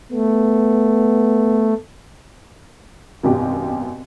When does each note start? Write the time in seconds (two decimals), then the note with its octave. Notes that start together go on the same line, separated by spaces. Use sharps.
0.12 A3 B3
3.23 G#1 F#2 B2 G4